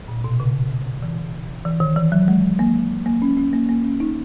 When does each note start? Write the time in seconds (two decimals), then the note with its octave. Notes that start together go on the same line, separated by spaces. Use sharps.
0.08 A#2
0.24 B2
0.40 C#3
1.03 E3
1.65 E3
1.80 D#3
1.96 E3
2.12 F#3
2.28 G#3
2.59 A#3
3.06 A#3
3.22 C#4
3.37 C#4
3.53 A#3
3.69 A#3
3.84 C#4
4.00 D#4